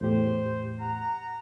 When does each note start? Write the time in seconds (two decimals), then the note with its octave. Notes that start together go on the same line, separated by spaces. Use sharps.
0.01 E2 A2 G4 C5
0.80 F#5 A#5